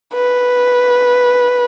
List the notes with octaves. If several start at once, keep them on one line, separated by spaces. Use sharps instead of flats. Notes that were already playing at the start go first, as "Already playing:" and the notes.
B4